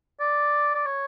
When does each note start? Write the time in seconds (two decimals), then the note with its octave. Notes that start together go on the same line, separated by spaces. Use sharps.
0.20 D5
0.75 D5
0.86 C#5